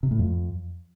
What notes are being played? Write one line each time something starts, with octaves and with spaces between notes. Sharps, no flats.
C3
A2
F2